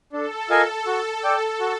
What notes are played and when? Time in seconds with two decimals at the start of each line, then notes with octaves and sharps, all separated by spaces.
0.12 D4 A4
0.50 F4 A#4 D#5 G#5
0.86 F#4
1.23 A4 D5 G5
1.60 F#4